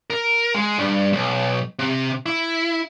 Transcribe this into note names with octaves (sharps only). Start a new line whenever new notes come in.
A#4
G#3
G2
B1
C3
E4